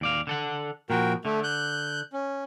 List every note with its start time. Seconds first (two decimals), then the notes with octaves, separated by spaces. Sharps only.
0.01 D#2 D5 F5
0.27 D3 A4 F#5
0.90 A#2 F3 F#4 A#4 G5
1.25 D3 A3
1.44 F#6 G6
2.13 C#4